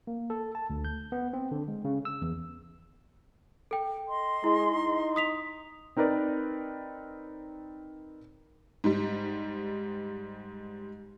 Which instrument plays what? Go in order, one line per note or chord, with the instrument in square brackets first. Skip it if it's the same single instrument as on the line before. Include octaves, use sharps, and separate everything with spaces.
[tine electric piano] A#3
A4
A5
D2
G6
B3
C4
D3
G#3
C#3
E6
E2
[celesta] A4 G5
[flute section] D#5 C6
[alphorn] G#3 [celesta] E4
[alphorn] D#4
[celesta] D#6 B6 F7
[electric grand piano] C4 D#4 A#4 B4 D5
[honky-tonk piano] G#2 G3